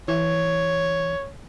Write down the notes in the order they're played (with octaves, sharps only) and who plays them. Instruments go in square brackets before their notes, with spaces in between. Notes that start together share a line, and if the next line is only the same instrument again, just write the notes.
[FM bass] E3 [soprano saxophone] C#5